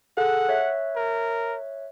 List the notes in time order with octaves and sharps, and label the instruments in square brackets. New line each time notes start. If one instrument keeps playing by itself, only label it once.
[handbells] G#4 A4 F#6 [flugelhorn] F#5
[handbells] C#5 E5 F#6
[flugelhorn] A#4